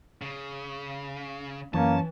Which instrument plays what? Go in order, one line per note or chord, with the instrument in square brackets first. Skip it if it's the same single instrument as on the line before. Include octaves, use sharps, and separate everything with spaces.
[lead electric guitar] C#3
[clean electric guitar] F#2 C#4 [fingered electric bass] E3 [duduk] A#3 [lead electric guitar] A5